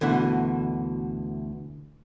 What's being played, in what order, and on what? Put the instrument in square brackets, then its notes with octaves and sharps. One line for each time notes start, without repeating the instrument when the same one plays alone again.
[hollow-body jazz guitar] D2 B2 D3 E3